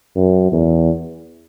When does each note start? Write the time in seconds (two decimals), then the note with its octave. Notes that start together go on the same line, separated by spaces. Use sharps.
0.16 F#2
0.52 E2